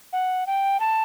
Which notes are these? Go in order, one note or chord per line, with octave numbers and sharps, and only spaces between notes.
F#5
G5
A5